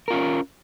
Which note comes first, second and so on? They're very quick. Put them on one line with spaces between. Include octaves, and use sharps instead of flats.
A#4 F4 C#4